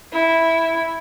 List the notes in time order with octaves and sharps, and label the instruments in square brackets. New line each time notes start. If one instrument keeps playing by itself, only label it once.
[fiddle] E4